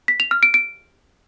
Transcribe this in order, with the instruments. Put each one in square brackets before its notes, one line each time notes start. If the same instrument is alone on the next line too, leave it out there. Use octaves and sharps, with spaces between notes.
[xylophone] B6
F7
F6
D7
D7